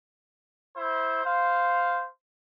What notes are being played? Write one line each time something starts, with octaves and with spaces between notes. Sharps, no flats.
E4 C5
C5 F5